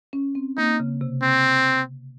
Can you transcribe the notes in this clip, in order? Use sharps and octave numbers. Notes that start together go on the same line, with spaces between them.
C#4
C4
A#3 D#4
C#3
C3
C4